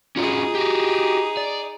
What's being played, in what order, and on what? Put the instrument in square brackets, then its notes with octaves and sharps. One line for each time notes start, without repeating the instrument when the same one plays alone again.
[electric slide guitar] C#4 F4 F#4 [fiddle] D#4 G#4
[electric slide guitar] F#4 G4
D5